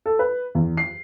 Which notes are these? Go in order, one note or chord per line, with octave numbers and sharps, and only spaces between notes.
A4
B4
E2
C7